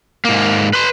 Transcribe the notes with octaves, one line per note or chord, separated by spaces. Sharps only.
G#2 A#3
B4 C6